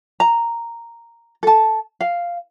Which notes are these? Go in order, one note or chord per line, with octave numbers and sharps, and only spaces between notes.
A#5
A4 A5
F5